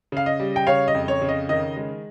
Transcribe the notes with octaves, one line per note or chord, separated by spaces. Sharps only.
C#3 F5
D#5
G3
G5
C#3 C#5 F5
D#5
F2
C#5
C#3
D#5
D#3 D#5
G#3